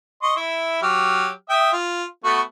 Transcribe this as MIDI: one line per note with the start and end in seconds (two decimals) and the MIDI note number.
0.22 0.35 75
0.22 0.35 84
0.22 0.35 85
0.37 0.81 64
0.37 0.81 76
0.82 1.29 54
0.82 1.29 67
0.82 1.29 89
1.50 1.71 76
1.50 1.71 79
1.50 1.71 87
1.73 2.04 65
2.24 2.40 57
2.24 2.40 59
2.24 2.40 66